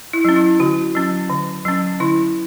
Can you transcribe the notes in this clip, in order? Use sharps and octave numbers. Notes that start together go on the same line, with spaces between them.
E4
F#3 C#4
E4
D3 F#4
F#3 C#4
D3
F#3 C#4
D3 E4